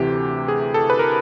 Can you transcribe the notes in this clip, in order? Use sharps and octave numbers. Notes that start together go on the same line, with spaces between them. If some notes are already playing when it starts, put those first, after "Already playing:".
Already playing: D2 C3 E3 G4
G#4
A4
B4
A#4